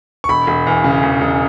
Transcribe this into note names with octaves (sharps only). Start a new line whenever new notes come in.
C#6
E1 B5
E1
E2
C#3
E1
E1